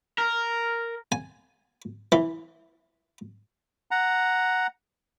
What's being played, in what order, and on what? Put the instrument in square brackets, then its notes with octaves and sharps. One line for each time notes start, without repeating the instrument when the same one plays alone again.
[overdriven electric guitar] A#4 [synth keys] F6
[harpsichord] G#5
E3
[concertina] F#5 A#5